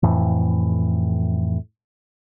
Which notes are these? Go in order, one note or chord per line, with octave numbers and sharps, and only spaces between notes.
F2 A2 E3